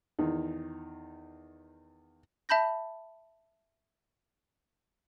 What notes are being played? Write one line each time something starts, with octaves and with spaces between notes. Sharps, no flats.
E2 D#3
E5 A5 B5 G6 A#6